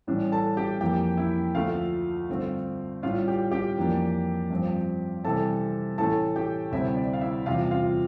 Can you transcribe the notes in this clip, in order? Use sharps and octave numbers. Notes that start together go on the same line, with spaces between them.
A2 E3 G3 D4
A4 A5
G4 G5
F2 E3 A#3 G4 G5
E4 E5
D2 D3 F3 A3 F4 F5
G2 D3 A3 C4
A2 G3 D4 F4 F5
G4 G5
G4 G5
F2 E3 A#3 D4
G2 F3 C4
C3 E3 G3 C4 A4 A5
A2 E3 A3 A4 A5
G4 G5
D2 C3 G3 C4 E4 E5
D5
F5
E4 E5
E2 C3 G3 F4 F5
F4 F5